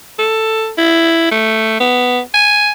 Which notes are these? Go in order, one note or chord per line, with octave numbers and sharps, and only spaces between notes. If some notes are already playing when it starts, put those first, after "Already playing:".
A4
E4
A3
B3
G#5